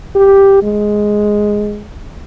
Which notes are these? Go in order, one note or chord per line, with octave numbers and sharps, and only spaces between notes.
G4
G#3